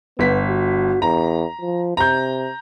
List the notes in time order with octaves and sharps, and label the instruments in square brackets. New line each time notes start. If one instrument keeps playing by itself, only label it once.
[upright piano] G1 B6 [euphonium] B3
[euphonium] F#4
[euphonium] E2 [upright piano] A#5
[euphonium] F3
[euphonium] C3 [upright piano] A#5 G6